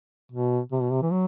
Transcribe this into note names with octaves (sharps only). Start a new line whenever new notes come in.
B2
C3
B2
C3
E3
F#3